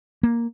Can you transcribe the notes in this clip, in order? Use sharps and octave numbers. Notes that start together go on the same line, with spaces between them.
A#3